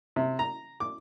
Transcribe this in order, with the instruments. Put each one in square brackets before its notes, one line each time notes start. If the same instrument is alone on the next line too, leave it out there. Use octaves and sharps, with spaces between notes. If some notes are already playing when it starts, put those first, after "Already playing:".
[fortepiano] C3
A#5
D6